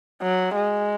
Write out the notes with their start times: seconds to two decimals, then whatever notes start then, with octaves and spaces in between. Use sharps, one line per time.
0.22 F#3
0.55 G#3